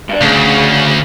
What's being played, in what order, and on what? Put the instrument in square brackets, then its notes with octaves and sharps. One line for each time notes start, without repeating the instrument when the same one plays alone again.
[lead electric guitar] G2 D4
[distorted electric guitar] D2 [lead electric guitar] C#3